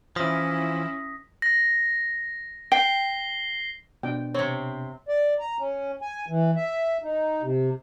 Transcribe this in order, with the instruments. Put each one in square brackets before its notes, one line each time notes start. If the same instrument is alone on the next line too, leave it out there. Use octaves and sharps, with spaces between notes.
[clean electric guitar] E3 F3 [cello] C#4 E4 [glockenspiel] D#6 A#6 B6
[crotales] A#6
[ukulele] G5 [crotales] C7 G7
[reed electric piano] B2 B3 D4 [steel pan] G5
[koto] C3 C4 [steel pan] C#5
[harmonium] D5
A#5
C#4
G#5
E3
E5
D#4
C3